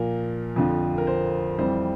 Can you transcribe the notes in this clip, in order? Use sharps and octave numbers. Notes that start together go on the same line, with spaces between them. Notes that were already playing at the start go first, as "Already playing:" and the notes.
Already playing: A#2 F3 A#4
F2 D3 F3
A#4
C5
F2 E3 G3 C5